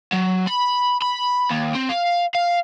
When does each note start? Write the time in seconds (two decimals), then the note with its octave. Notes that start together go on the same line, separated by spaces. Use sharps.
0.12 F#3
0.47 B5
1.02 B5
1.50 D#2
1.75 C4
1.90 F5
2.35 F5